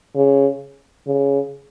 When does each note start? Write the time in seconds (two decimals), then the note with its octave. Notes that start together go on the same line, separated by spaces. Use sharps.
0.16 C#3
1.07 C#3